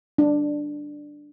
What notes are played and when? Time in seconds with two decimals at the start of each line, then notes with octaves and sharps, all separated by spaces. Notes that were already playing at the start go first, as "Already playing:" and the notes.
0.18 D4